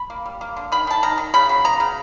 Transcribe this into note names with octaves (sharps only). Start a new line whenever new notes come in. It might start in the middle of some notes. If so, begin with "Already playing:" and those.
Already playing: B5
A#3
G3
A#3
D3
D#3 B5
D#3 A5
D#3 A#5
D#3
C#3 B5
F#3
B3 A#5
C#3